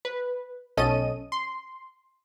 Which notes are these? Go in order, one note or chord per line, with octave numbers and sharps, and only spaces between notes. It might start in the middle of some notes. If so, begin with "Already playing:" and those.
B4
B1 C#4 A4 D#5 D#7
C6